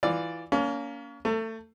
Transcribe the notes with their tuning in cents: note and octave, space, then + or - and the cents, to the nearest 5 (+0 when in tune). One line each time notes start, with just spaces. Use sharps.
E3 +0 F4 +5 D5 +0
A#3 +0 C#4 +35
A3 +25 A5 +45